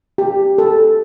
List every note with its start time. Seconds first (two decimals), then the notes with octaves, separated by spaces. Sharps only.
0.18 G4
0.58 A4